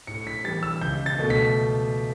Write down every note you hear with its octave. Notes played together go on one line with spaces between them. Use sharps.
A2 C#7
B6
E3 G3 A6
E6
C#2 G6
A6
B2 A3
B6